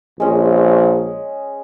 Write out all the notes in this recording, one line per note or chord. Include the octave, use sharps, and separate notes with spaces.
A#1 G#3 C#4